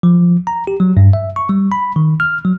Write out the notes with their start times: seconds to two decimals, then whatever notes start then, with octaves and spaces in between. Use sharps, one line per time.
0.03 F3
0.47 A#5
0.67 G4
0.80 F#3
0.97 G2
1.13 E5
1.36 C#6
1.49 G3
1.72 B5
1.96 D#3
2.20 F6
2.45 F#3